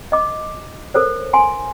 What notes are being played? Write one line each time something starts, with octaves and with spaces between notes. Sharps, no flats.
D#5 D6
A4 A#4 C5 C#5
G#5 C6